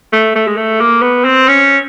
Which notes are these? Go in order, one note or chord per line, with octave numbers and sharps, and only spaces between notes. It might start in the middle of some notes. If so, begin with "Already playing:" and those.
A3
A3
G#3
A3
A#3
B3
C4
C#4